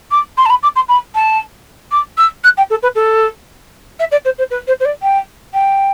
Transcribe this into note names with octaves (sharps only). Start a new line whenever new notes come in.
D6
C6
A5
B5
D6
C6
B5
A5
D6
E6
F#6
G5
A4
B4
A4
E5
D5
C5
C5
B4
C5
C5
D5
G5
G5